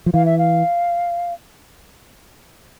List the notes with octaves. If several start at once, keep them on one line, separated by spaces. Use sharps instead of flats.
F3
E3 F5
E5
F5